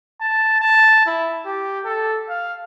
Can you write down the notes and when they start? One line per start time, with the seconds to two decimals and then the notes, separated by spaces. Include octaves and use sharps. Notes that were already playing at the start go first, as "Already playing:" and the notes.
0.21 A5
0.60 A5
1.06 E4
1.45 G4
1.85 A4
2.29 F5